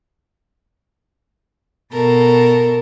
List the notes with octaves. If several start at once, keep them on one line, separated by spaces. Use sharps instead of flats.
B2 A4 A#4